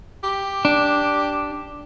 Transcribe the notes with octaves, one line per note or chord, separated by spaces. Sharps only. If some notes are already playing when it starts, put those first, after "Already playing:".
G4
D4